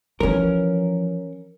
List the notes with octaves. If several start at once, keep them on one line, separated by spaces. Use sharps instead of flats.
E3 F3 C#4 A#4